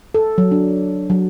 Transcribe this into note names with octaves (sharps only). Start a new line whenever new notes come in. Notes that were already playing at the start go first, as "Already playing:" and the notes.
A4
F#3
D4
F#3